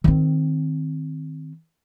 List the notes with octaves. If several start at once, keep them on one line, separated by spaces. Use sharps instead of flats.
D#3 C4